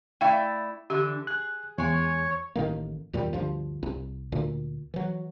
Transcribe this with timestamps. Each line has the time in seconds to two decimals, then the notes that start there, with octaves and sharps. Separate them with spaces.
0.21 A3 E4 D5 F5 G5
0.90 D3 E3 D4 G4
1.27 G#4 F#6
1.78 E2 G#3 C#5 G#5
2.56 A1 A2 D#3 A#3
3.13 D#2 A#2 D#3 G3
3.33 D2 G2 F3
3.83 C2
4.32 D2 A#2
4.94 E3 F#3